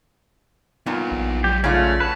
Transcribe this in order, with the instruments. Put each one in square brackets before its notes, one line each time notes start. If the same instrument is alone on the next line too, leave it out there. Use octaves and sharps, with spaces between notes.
[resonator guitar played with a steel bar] G2 A#2 [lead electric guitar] B3 D#4
[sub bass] A#1
[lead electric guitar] F#3 G#3 [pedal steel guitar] G4
[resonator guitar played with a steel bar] C#3 F4 [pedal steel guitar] A3 C#4 [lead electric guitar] D5
[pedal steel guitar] F#4 B4 [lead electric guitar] A5